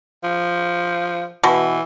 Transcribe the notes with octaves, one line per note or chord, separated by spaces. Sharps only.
F3
B2 E3